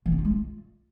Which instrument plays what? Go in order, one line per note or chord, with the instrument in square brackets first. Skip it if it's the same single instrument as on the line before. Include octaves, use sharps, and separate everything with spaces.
[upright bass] E3
C#4
F4
G#3
F4